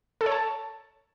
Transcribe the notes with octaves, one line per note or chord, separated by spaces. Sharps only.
A4
C#5
A5